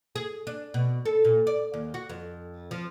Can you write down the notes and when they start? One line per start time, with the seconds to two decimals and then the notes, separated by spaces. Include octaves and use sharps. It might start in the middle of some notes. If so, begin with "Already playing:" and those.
0.16 G#4
0.47 D4
0.74 B2
1.05 A4
1.25 A#2
1.47 D5
1.74 D#2
1.94 F#4
2.09 F2
2.71 F3